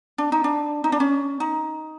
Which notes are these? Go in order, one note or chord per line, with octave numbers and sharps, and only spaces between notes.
D4
D#4
D4
D#4
D4
C#4
D#4